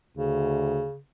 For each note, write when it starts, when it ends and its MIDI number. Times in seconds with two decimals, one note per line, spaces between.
0.17 0.86 38
0.17 0.98 49